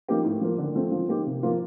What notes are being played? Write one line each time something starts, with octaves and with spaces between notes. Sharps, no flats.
F3 A#3 D#4 G4
A2
F3 A#3
D3
F3 A3 C4
F3
A#3 D#4 G4
C3
F3 A#3 F4